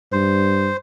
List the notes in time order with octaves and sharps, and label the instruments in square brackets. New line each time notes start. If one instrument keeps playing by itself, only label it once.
[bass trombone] G2 [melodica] C5